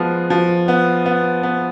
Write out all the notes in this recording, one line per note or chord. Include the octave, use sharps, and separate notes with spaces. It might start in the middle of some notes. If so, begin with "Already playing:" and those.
Already playing: F3 G#3 B3
F3
B3
B3
B3